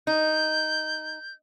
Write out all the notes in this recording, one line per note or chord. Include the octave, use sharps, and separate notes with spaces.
D#4 G6